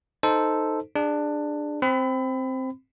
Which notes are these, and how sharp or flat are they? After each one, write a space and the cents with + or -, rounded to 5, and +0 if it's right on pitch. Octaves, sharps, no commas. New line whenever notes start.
D#4 +0 A4 +0 C5 -5
D4 +15 G#4 -20
C4 +0 B5 +30